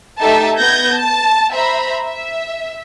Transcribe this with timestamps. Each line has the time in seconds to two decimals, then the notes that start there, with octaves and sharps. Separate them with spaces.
0.20 A3 D#4 G4 A4 E5 A5
0.58 B3 B4 G6 G#6 A#6
0.94 A5
1.53 C5 E5 A#5 B5
2.04 E5